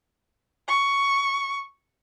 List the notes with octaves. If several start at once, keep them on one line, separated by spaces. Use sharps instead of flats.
C#6